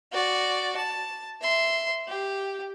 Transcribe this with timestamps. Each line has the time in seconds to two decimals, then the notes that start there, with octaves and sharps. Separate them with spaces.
0.12 F#4 D5
0.77 A5
1.41 E5 C6
2.08 G4